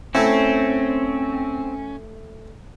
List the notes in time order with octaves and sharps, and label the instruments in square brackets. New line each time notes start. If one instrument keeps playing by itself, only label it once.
[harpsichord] A3 E4 [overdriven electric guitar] C4 [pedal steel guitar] C#4